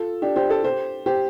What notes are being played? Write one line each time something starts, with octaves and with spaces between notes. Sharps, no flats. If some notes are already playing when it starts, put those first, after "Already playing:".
Already playing: F4 A4
D4 G4
G4 C5
A4 D5
G4 C5
G4 C5